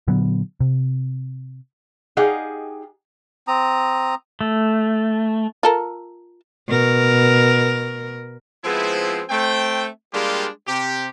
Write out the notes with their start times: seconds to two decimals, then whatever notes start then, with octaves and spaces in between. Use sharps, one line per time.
0.08 A#2 D3 F#3 B3
0.60 C3
2.17 D#4 G4 G#4 D#5 F5 F#5
3.48 C4 A#5 D#6
4.41 A3
5.63 F4 A4 A#4
6.68 B2 A#4
8.64 F3 G#3 B3 C4 E4
9.30 A3 C4 G5
10.14 G3 G#3 A#3 D4 F4 G4
10.68 C3 G4